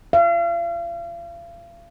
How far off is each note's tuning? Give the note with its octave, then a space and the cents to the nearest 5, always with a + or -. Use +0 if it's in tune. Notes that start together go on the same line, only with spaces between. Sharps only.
F5 -40